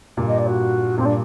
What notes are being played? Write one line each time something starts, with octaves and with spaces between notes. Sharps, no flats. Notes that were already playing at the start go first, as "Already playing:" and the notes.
G2 A#2
D#5
D5
F#4
G2 A#2 C4
D4